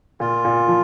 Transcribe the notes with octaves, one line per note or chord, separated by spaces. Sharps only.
A#2 F4
A#2
F3